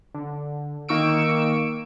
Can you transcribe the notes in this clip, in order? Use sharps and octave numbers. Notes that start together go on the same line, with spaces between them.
D3
D#3 A#3 D#4 C#6 E6 D7